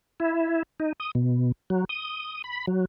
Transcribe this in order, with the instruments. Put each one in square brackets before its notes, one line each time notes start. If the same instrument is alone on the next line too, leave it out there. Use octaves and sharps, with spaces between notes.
[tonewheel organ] E4
D#4
D#6
B2
F#3
D#6
B5
F#3